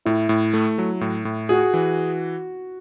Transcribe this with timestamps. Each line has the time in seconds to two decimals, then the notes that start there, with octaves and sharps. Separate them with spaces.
0.05 A2 E4
0.29 A2
0.54 A3
0.78 F#3
1.01 A2
1.25 A2
1.49 F#4 G#4
1.74 E3